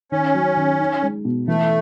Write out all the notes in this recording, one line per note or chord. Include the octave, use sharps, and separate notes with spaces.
D#3 C#4
F#3
D#3
D#4
G#3
B2
E3 A3